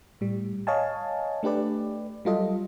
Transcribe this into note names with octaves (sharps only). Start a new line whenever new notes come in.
A2 G3
C#5 D#5 F5 G#5 A5
A3 D4 G4 B4 D5
F#3 G3 F4 A4 D#5